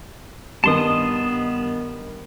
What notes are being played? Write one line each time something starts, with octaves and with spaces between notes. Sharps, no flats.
G2 D#3 B3 A5 C6 D#6